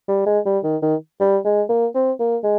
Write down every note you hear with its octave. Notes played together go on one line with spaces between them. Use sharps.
G3
G#3
G3
D#3
D#3
G3
G#3
A#3
C4
A#3
G#3